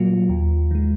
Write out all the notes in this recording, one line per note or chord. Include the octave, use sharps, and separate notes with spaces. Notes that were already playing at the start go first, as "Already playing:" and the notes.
Already playing: A#2 F#3 A#3 F4
D#2
D#3 G#3